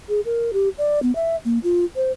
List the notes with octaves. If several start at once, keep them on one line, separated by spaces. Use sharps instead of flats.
G#4
A#4
G4
D5
B3
E5
A#3
F4
C5